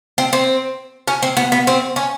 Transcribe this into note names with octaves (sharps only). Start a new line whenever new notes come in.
C4
C4
C#4
C4
B3
B3
C4
C#4